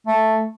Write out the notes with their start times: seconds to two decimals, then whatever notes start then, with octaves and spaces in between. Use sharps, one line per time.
0.07 A3